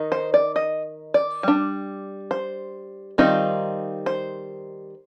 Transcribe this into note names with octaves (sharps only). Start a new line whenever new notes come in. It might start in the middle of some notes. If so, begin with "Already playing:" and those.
Already playing: D#3 D#4
C5
D5
D#5
D5
G3 D4
C5
D#3 G3 C4 D#4 F4
C5